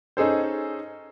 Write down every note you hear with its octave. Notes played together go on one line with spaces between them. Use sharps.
C#4 D#4 G#4 A4 C5